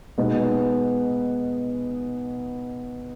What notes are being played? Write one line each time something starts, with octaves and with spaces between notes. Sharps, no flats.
B2 G#3 B3 D#4